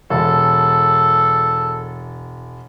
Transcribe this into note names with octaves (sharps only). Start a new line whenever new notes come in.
E1 A4